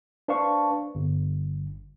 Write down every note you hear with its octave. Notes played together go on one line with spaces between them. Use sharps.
D4 B4 C5 F5 A5 C#6
G1